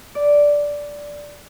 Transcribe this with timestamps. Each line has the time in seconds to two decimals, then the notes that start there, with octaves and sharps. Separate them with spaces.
0.15 D5